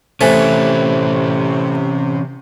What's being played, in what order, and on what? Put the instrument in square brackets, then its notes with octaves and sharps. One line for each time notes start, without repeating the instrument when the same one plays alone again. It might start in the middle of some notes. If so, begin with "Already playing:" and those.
[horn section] C3 [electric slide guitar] E3 C#4 [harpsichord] A3 [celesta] C5 G#5 F#6